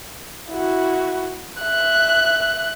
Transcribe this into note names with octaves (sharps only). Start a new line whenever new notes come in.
E4 F#4
E5 F#6